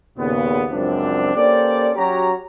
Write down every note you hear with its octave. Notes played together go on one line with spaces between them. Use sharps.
D#2 A#2 C#3 B3
C#2 F#2 F3 C4 D4
A#3 C#4 G4 A4 C5 D5
F#3 C#4 F#4 G4 C#5 A#5